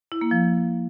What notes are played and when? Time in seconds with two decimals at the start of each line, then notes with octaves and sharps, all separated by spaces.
0.12 E4
0.21 A#3
0.31 F3